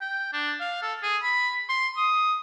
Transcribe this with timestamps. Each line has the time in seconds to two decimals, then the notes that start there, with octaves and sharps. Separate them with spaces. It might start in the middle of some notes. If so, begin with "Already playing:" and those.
0.01 G5
0.33 D4
0.60 F5
0.82 A4
1.03 G#4
1.22 B5
1.69 C6
1.97 D#6